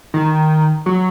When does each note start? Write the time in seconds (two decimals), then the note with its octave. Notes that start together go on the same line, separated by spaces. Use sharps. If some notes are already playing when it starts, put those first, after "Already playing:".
0.14 D#3
0.86 F#3